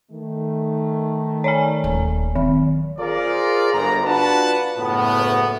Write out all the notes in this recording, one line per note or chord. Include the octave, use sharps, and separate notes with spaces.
D#3 A3
C#5 D5 G#5
D#1
D#3 F#3
F4 G#4 A#4 C5 D5
G1 A#5
D4 F4 F#4 B4 F#5 A5
F#1 A2 B3